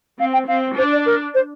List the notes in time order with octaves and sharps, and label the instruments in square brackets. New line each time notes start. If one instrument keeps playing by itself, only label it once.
[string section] C4 [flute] F5
[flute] G5
[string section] C4 [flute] F5
[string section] D4 [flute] C5
[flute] D5
A#4
C5